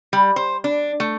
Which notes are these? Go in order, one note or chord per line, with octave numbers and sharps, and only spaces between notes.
G3
C5
D4
A3